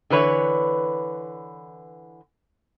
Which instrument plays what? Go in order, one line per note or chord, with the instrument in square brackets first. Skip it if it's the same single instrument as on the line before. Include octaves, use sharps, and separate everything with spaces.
[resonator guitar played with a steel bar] D3 E3 B4 C#5